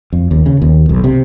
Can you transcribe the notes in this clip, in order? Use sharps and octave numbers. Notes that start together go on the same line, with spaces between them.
F2
D#2
C#3
D#2
B1
C3